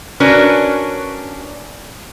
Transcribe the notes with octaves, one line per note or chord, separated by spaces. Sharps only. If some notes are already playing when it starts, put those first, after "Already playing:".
C#4 D4 F#4 A#4 B4 C#5